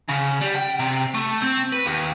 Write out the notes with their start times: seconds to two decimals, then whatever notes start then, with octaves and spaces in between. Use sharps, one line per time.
0.09 C#3
0.42 G3
0.56 G5
0.80 C3
1.14 A3
1.42 C4
1.72 B4
1.86 D#2